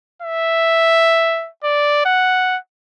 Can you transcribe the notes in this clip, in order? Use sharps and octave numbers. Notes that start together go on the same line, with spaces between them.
E5
D5
F#5